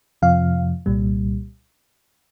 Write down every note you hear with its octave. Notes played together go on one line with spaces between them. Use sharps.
F2 C3 F3 F5
C2 A#2 G3